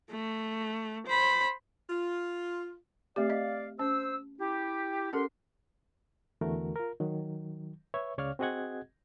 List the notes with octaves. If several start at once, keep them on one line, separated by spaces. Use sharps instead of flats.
A3
C5 B5
F4
A3 C4 G4 D5 F5
D#5
C#4 C5 E6
E4 G4
C#4 G4 A4 A#4 F#5 C6
E2 D3 E3 A3 F#4 A#4
F4 A#4
D#3 F#3
B4 C#5 E5 C#6
C#2 C#3 C#5 D5 F5 F6
C4 F#4 G#4 D#5 F#5 G#6